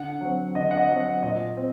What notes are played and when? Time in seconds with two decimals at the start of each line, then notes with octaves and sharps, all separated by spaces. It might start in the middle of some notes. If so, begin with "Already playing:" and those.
Already playing: D3 F#5
0.21 F#3 C4
0.55 D3 D#5
0.71 F#5
0.77 D#5
0.89 F#3 C4
1.00 F#5
1.23 A#2 D#5
1.57 C4